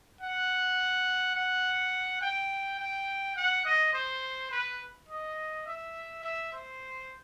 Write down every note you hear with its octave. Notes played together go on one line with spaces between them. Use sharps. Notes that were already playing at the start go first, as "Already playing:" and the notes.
F#5
F#5
G5
G5
F#5
D#5
C5
B4
D#5
E5
E5
C5